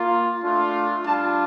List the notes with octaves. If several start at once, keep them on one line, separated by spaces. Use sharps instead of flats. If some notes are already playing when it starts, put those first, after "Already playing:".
Already playing: A#3 F4
A3 D4 F4
G3 D4 F4 A5